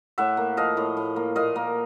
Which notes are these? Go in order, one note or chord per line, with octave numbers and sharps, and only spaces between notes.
A2 E5 F#5
A#3
F3 D#5 F5
A2
A2
A#3
A#2 D#5 F5
A#3